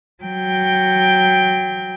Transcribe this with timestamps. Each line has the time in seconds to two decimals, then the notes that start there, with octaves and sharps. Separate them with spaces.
0.23 F#3 G5